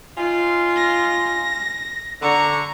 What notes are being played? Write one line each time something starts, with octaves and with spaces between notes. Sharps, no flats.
C#4 D#4 F4
A#6
D3 A#5 C#6